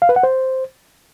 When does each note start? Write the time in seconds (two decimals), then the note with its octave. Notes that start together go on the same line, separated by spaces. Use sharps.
0.02 F5
0.09 B4
0.16 F#5
0.23 C5